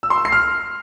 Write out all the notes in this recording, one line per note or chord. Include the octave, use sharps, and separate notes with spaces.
E6
C6
E6
C7
F6